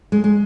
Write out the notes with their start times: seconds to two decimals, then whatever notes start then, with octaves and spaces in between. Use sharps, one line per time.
0.12 G#3
0.24 G#3